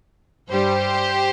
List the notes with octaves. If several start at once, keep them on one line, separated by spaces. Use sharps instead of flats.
G2 G3 G4 C5